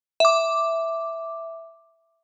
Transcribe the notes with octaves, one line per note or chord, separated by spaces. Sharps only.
E5 D6